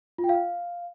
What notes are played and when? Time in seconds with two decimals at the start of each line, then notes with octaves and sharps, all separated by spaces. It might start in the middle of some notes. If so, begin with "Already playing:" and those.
0.18 F4
0.24 G5
0.29 F5